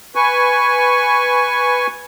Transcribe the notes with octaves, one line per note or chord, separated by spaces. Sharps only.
B4 G#5 C#6